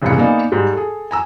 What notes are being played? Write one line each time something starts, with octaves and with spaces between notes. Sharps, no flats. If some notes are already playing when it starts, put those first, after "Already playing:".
F1 C#2 G#2 E3 C#7
A#3 B3 D#4 D5 G#5
G#2 G3
G#4 A4
G#5 A#5 E6